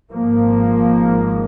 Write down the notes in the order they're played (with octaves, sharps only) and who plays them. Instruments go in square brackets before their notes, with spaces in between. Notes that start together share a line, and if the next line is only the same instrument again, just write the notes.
[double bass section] G#1 G#2 F3 A#3